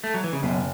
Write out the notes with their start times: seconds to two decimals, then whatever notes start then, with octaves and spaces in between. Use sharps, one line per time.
0.04 A3
0.14 F#3
0.24 E3
0.33 C#3
0.42 F#1 F#2 B2